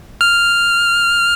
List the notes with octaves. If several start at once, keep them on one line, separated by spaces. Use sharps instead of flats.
F6